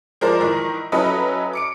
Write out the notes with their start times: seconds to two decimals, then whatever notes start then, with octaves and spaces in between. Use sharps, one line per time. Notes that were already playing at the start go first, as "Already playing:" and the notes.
0.21 F3 G#3 A#4 C5 D5
0.40 D#3 E3 A#4
0.92 F#3 C#4 E4 A4 B4 D#5
1.53 D6 C#7 D7